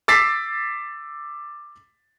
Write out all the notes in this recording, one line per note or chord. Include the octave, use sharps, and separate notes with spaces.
D6 E6 A6 B6 C7